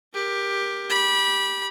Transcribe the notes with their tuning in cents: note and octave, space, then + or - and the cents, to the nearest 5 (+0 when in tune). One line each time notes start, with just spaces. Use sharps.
G4 +10 A#4 +15
G4 +0 B5 -25